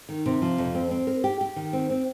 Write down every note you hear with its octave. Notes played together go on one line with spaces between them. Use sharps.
D#3
C3
F3
F2
C4
C4
A#4
G4
G4
D#3
C4
C4